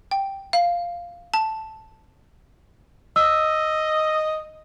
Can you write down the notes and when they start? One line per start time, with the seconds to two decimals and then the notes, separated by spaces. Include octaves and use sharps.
0.11 G5
0.53 F5
1.34 A5
3.16 D#5 E6